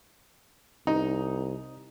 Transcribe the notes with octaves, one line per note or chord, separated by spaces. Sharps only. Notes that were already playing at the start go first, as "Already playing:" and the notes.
C2 D#4